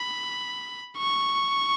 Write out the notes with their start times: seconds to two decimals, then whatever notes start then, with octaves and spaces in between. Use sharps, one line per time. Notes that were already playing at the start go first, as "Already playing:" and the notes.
Already playing: B5
0.98 C#6